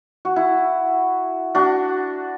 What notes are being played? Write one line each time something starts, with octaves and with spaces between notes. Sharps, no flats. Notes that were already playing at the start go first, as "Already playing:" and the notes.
F#4
E4
D4 F#4